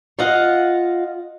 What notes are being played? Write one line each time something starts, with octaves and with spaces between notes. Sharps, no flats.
F4 D#5 F5 F#5